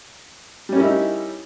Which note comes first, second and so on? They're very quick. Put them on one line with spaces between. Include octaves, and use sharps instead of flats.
G3 C#4 A#4 E4 D#4